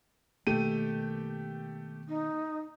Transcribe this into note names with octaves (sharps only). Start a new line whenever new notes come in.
B2 D#3 A3 A#3 G4 D#7
D#4